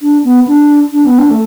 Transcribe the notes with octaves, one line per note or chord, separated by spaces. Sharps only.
D4
B3
D4
D4
B3
D4
A3